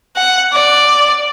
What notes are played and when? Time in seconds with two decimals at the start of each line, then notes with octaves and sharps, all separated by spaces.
0.16 F#5
0.53 D5